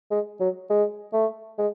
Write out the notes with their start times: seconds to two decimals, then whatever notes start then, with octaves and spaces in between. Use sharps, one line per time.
0.11 G#3
0.40 F#3
0.70 G#3
1.13 A3
1.58 G#3